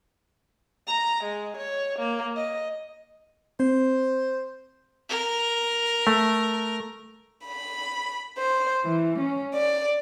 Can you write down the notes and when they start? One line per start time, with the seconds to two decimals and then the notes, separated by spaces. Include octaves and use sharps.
0.87 A#5
1.24 G#3
1.57 C#5
1.99 A#3
2.36 D#5
3.60 C4 C5
5.09 A#4
6.07 A3
7.48 B5
8.37 C5
8.85 E3
9.19 C#4
9.56 D5